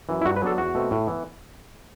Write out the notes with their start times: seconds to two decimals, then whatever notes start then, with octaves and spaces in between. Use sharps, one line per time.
0.09 F#2 E3
0.21 E4
0.26 G2 F#4
0.36 B4
0.42 F#3 B3 D4 A4
0.58 E2 F#4
0.75 B2 A3 C4
0.91 A2
1.07 E3 B3